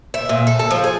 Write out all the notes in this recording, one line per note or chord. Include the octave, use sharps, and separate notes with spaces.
E5
A#2
A4
A4
F3
G#4